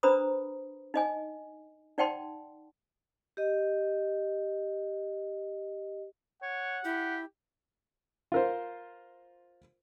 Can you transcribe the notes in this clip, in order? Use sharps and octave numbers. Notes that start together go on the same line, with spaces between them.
D4 B4 C5 A#5 B5 D#6
D#4 D#5 G#5
D#4 D5 F#5 G5 A5 C6
G4 D#5
C#5 F#5
E4 G4
F4 A#4 C5